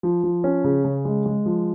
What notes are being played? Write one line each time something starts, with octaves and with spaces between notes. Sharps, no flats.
F3
F3
C#4
C#3
C#3
G#3
G#3
F3